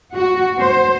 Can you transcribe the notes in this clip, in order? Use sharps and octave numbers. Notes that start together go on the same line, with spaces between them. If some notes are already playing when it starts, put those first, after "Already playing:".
F#4
C5